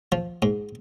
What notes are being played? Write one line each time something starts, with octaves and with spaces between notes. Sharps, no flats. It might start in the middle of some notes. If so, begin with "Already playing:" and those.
F3
G#2